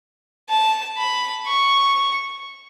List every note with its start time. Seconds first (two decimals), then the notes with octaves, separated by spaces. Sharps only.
0.49 A5
0.98 B5
1.46 C#6